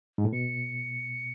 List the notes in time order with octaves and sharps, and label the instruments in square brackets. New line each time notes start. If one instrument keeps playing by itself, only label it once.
[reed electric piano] G#2
A2
[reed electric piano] B2 [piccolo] C#7